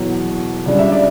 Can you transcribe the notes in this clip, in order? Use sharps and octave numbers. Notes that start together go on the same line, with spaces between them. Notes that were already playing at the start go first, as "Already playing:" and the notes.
Already playing: E2 B2 F#3
C#2 C#3 G3 D4 D5
E5
D5